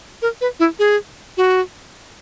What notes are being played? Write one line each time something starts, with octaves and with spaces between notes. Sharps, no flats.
A#4
B4
E4
G#4
F#4